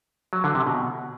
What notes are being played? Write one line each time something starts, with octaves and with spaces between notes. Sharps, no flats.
F#3
D3
C3
B2